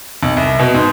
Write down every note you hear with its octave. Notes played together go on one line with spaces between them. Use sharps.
B1
C2
B2
G#2